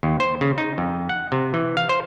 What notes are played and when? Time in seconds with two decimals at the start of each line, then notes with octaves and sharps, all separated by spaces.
0.03 D#2
0.20 C5
0.41 C#3
0.58 D#4
0.78 F2
1.09 F#5
1.32 C3
1.54 E3
1.77 F5
1.89 C5